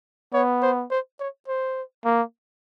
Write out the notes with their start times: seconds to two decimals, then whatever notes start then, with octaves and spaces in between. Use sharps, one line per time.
0.33 B3 C#5
0.62 C5
0.91 C5
1.19 C#5
1.48 C5
2.05 A#3